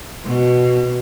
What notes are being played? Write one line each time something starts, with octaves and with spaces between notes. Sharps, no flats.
B2